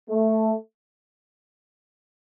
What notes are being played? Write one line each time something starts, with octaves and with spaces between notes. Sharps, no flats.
A3